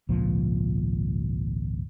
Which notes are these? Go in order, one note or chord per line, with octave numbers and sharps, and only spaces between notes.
G#1 C#2 A#2 F3